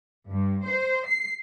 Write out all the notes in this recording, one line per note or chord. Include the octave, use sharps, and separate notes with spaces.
G2
C5
C7